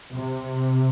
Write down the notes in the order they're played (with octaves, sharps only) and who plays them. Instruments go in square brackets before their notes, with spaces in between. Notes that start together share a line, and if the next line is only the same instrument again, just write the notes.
[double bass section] C3